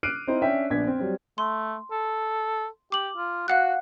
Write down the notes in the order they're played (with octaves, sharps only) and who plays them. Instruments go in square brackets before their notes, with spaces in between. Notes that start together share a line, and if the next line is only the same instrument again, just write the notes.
[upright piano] D6 F6 F#6 C7 D7 D#7
C4 D#4 E4 C5
C#4 D4 E5 G5
A#1 B3 D4 G#6 B6
C4
F#3 G3 C4
[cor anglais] A3 [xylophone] C6
[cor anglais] A4
[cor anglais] G4 [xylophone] D6 F#7
[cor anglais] F4
[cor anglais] F#4 [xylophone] F5 F#5 F#6